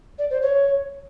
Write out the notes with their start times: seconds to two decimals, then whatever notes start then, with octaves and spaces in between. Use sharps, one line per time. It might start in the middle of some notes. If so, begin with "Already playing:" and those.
0.18 D5
0.30 C5
0.42 C#5